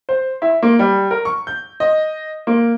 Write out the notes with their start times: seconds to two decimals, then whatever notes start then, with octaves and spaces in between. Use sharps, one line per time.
0.09 C5
0.42 E4
0.63 A#3
0.79 G3
1.11 A#4
1.25 C#6
1.47 G6
1.80 D#5
2.47 A#3